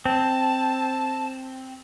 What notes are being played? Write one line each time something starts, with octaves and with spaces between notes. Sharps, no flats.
C4 A5